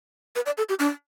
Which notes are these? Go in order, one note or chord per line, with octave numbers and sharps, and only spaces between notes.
B4
D5
A4
G4
D4